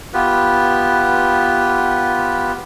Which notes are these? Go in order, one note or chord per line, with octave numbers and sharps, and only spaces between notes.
B3 F4 G4 B4